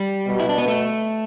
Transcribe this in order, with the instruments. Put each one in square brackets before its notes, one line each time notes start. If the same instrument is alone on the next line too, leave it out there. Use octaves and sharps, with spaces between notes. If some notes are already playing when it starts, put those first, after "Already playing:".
Already playing: [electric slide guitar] G3
[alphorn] B2
[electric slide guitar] E4
D4
B3
A3